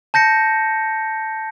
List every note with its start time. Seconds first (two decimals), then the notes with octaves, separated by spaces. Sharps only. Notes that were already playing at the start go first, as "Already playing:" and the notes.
0.14 A5 G6 A#6 C#7